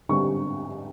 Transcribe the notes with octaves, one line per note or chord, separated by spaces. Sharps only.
D3 G3 C4 C#6